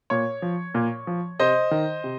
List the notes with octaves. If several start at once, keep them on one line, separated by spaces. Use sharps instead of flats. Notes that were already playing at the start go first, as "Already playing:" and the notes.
A#2 C#5
F3
A#2
F3
C3 C5 D#5
D#3
C3